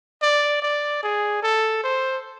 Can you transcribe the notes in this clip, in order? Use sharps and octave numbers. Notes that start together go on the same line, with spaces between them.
D5
D5
G#4
A4
C5